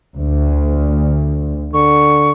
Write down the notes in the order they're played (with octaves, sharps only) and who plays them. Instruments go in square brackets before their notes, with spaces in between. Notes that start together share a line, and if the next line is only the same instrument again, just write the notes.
[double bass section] D2
[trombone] D3 [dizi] C#6